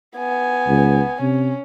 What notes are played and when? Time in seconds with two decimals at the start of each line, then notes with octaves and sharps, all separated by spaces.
0.17 B3 G#5
0.68 C#2
1.21 C3 C#4